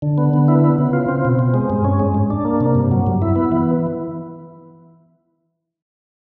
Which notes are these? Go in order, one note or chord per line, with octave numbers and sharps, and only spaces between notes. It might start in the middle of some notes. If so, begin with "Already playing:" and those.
D3
B3
D3
E4
B3
C#3
F4
C4
B2
C4
G#3
G2
C#4
G#3
G#2
D4
A#3
C3
G2
F#3
G2
E4
B3
E3